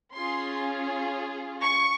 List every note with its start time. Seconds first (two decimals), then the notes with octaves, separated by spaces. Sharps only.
0.14 C#4 F4 G#4 C6
1.63 C#6